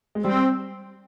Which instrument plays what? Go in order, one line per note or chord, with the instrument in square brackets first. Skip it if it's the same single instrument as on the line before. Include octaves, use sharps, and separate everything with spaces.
[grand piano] G#3
[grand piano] G3 [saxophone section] C4